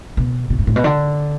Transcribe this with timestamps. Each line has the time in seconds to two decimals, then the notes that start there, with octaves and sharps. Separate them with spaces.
0.17 B2
0.50 B2
0.59 G2
0.67 A2
0.76 B2
0.84 D3